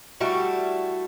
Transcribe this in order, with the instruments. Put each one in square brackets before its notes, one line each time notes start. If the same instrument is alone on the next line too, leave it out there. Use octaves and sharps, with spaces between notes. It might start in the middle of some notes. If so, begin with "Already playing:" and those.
[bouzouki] G3 A3 E4 F#4